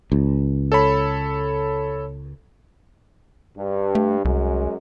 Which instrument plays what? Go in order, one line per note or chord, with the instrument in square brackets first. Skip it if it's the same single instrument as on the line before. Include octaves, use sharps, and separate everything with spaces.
[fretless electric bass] C#2
[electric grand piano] A4 C#5 B5
[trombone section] G2
[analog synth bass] A3
[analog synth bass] C2 [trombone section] F#2 F#3 G#3